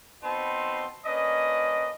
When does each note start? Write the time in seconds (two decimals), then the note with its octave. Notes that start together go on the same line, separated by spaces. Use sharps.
0.23 B2 C4 D#4 A5 B5 C6
1.06 A#3 C#4 D4 B4 D#5